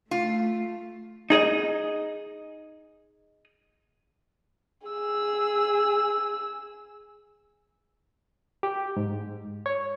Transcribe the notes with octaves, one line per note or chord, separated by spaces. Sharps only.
A3 F4
D#4 G#4 D#5
G#4 E6
G4
G#2
C#5